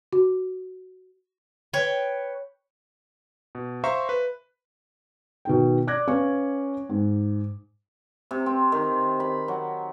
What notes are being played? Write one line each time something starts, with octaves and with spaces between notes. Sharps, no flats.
F#4
B4 C#5 G5
B2
C5 E5 F5 A#5 C6 C#6
B4
B2 D#3 G5
D5 D6 F#6 G#6 A#6
C#4 B4 F5 G#5 C#6
G#2
C3
C4
D#3
B5
F#3